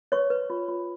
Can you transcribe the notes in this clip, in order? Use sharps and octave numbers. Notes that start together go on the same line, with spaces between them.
B4 C#5 C#6
B4
F4
F4